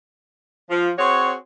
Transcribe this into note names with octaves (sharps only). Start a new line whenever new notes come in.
F3
C4 F#4 G#4 C#5